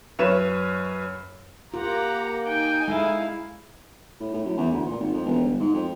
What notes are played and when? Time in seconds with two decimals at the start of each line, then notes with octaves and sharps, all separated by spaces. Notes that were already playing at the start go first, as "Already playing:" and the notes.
0.19 F#2 B4 C#5 E7
1.74 A#3 F4 G4 F#5 A#5
2.46 D#4 G5 G#5
2.88 G#3 E4 A4 F5
4.20 A2
4.34 A2
4.45 F#2
4.57 E2
4.72 D2
4.86 A#2
5.00 G#1
5.14 F2
5.26 E1
5.44 G1
5.60 G#2
5.74 F2